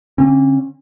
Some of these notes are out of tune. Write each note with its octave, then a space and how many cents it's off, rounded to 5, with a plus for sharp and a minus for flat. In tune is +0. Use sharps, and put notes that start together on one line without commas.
D3 -25 C#4 -45